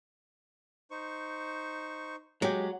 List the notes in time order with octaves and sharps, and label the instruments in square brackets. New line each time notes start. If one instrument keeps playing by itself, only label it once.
[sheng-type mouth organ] D#4 C5 C#6
[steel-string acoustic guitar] F#3 [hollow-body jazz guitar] G#3 G4